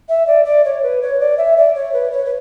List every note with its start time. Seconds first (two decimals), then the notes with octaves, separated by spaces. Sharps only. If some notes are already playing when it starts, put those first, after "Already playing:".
0.09 E5
0.27 D5
0.45 D5
0.65 C#5
0.83 B4
1.01 C#5
1.20 D5
1.38 E5
1.57 D5
1.75 C#5
1.93 B4
2.12 C#5
2.25 B4